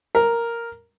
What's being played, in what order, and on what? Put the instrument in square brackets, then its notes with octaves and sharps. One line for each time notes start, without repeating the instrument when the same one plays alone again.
[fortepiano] A#4